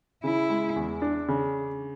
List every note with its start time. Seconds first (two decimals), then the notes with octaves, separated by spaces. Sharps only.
0.24 C#3 E4
0.50 G#3
0.76 E2
1.02 D4
1.28 C#3